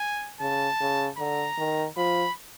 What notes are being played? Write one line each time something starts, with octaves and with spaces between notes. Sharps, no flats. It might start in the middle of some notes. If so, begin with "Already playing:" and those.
Already playing: G#5
C#3 A5
C#3
D3 A#5
D#3
F3 B5